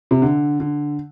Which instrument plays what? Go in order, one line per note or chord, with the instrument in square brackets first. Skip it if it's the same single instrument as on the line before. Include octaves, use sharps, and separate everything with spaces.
[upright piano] C3
D3
D3